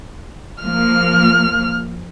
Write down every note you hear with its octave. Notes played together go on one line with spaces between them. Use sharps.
F3 A#3 F6